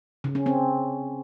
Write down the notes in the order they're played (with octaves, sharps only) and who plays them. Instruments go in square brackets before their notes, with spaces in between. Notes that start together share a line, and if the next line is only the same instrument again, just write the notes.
[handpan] C#3
C#4
C4